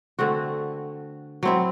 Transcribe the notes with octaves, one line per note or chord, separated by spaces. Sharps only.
D3 A3 C4 F#4
F#3 C4 E4